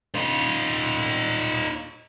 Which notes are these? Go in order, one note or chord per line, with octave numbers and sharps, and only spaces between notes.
D#4 F4